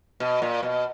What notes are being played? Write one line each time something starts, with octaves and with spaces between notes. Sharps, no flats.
B2
A#2
B2